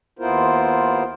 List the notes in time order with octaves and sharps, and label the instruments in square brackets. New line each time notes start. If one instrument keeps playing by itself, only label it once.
[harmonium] D#2 B3 E4 F4 A#4 C5